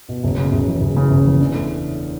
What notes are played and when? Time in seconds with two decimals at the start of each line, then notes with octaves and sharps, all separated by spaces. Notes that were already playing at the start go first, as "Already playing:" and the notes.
0.09 B2
0.24 F#1
0.38 C#3
0.52 F#1
0.67 E2
0.81 F#1
0.97 C#3
1.11 F#1
1.25 E2
1.40 D4
1.55 A3